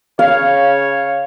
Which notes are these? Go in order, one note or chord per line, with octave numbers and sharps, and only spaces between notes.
C#3 C#5 F5